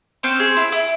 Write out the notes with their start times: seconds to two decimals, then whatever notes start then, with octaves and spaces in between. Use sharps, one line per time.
0.23 C4 C#4 C5
0.40 G#4
0.57 E4
0.72 E4